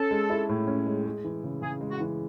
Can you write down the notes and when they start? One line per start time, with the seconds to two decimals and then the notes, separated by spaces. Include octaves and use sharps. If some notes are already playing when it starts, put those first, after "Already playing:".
Already playing: C#4 A4
0.11 G#3
0.30 E4
0.49 A2
0.67 C#4
0.87 G#3
1.06 G#3
1.24 E3
1.44 C#3
1.62 C#3 G#4
1.81 G#3
1.90 F#4
2.00 E3